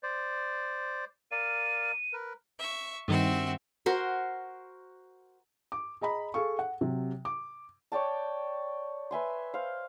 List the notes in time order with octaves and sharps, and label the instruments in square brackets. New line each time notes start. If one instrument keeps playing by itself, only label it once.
[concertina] C5 D5
[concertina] A#4 D5 F5 [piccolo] D#7
[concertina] A#4 B4
[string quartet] E5 C#6
[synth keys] G2 D#3 [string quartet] C4 F#4 E5
[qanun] F#4 A#4 C5
[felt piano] D6
G#4 D#5 A#5 B5
G#4 A4 F5 C#6
F#5
C3 F#3
D6
[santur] C#5 D5 G5 A5
B4 E5 G#5 C6
C5 F5